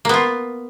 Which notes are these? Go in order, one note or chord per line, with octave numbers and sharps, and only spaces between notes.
A#3 B3 F4